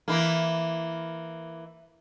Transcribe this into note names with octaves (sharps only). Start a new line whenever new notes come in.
E3 A#3